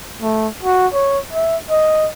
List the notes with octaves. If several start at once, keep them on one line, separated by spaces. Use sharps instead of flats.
A3
F#4
C#5
E5
D#5